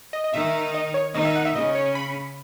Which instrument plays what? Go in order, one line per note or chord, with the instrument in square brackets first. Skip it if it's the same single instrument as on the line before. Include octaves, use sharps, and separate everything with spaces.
[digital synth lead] D#5
D#5
[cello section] D#3 D#4 [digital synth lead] E5
[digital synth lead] D#5
C#5
[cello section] D#3 D#4 [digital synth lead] D#5
[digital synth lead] E5
F#5
E5
[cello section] C#3 C#4 [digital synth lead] D#5
[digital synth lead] C#5
B5